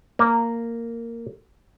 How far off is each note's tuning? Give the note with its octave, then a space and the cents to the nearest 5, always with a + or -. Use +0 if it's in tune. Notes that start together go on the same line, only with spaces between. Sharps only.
A#3 -10